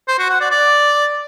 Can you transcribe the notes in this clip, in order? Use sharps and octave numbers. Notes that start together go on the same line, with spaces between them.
C5
F#4
F#5
D5
D5